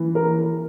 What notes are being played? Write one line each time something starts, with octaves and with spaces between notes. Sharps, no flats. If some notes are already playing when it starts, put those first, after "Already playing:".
Already playing: E3
A#4